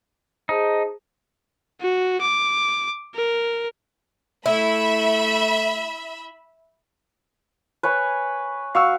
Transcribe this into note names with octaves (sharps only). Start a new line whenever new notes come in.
D#4 G#4 C5 A5
F#4
D6
A#4
A3 E4 E5 B5
B4 C#5 G#5
F#4 F5 C#6 E6